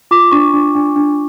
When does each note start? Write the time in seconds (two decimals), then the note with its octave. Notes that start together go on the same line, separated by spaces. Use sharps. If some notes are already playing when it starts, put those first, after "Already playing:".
0.11 F4 D6
0.31 D4 C#6
0.53 D4
0.75 D4
0.96 D4